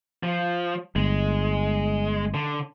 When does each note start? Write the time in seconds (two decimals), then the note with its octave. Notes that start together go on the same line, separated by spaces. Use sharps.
0.23 F3
0.96 G1 G#3
2.34 D3